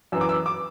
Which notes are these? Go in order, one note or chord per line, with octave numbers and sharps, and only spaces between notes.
F#2 E3 E6
D6
E6
D6